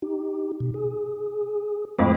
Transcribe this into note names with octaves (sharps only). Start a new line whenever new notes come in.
D#4 G4
B2
G#4
F2 A2 G#3 C5 D6